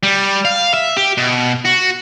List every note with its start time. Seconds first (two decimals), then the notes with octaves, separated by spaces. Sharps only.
0.03 G3
0.45 F5
0.74 E5
0.97 G4
1.17 B2
1.65 F#4